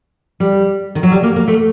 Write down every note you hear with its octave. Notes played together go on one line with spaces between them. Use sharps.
G3
D#3
F#3
G3
A#3
A#3
A3